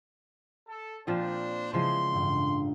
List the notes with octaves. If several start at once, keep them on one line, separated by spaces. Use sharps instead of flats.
A4
A#2 F3 C4 D4 C5 D5 F6 A6
C#3 E3 F3 G#3 C6
A1 G2 F4